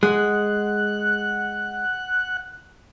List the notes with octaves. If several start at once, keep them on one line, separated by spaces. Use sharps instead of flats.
G#3 F#5 F#6